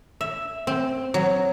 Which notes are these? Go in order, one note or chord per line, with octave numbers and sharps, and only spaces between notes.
E5
C4
F#3